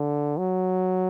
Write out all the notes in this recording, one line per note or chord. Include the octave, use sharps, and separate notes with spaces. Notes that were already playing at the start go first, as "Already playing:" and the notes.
Already playing: D3
F#3